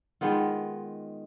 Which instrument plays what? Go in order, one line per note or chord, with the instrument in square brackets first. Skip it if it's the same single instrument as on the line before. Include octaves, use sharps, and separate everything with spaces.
[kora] D#3 G#3 B3 F4